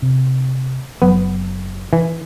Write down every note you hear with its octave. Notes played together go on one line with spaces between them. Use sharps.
C3
F#1 F#3 B3
E3